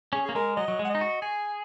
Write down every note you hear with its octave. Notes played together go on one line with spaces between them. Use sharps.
C#4 G#4
A#3 G#4
G#3 A#4
F#3 D#5
F#3
G#3
F#5
D#5
D#4
F#4
G#4 G#5